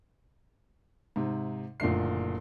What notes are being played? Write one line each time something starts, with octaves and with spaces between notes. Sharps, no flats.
G#2 C3
F#1 A#2 D3 A3 C7